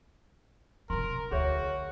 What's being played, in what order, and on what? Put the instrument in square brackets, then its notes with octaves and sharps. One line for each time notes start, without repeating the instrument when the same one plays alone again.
[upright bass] B1 C3 [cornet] A#4 [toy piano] C6
[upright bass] D2 [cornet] F#4 [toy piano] G#4 C#5 E5